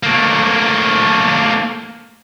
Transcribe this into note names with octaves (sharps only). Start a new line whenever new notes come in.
A3 A#3